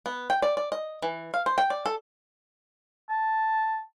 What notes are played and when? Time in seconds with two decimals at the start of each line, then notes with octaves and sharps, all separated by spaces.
0.06 B3
0.30 G5
0.42 D5
0.57 D5
0.72 D#5
1.02 E3
1.34 F5
1.46 C5
1.58 G5
1.70 D5
1.86 A4
3.09 A5